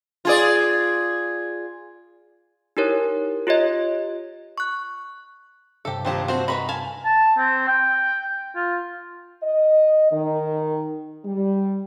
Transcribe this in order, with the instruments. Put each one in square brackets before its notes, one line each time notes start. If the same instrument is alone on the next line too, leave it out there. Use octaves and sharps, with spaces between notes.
[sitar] F4 G#4 D5
[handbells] D#4 E4 G4 A#4 C#5
F4 G4 C#5 D#5
C#6 F#6
[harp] G2 C3 [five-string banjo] G4 A4
[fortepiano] A#1 D#2 G4 [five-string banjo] C4 C5 A5
[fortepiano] C4 F#4 [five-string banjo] C5 A5
[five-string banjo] D#4 F#4 B4 [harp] A#5 [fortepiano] B5
[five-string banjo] F5 G#5 A5
[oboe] A5
C4
G5
F4
[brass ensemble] D#5
D#3
G3